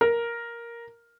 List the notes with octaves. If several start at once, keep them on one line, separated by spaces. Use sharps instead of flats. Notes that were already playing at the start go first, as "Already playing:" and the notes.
A#4